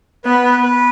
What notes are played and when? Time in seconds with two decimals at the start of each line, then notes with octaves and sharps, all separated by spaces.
0.25 B3 B4
0.63 B4